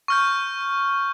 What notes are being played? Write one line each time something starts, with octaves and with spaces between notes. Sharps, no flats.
C#6 F6 G6